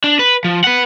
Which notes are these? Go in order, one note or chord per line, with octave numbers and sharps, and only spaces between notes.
D4
B4
F3
B4 F#5